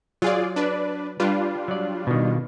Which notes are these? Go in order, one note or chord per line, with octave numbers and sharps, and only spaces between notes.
F#3 F4 G#4 D5
D4 B4 D5
G3 D4 F4 B4
F#3 D5
B2 D#3